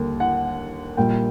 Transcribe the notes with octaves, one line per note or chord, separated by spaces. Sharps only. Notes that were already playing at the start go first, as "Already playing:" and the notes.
Already playing: D#2 D3 G3 A#3
F#5
A#1 A#2 G3 A#3 G5